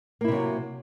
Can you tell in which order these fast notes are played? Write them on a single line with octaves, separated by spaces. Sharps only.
A#3 E4 C3 F#3